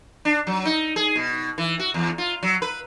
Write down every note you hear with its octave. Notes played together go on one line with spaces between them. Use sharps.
D4
F#3
D#4
G#4
B2
E3
F#4
E2
F4
F#3
B4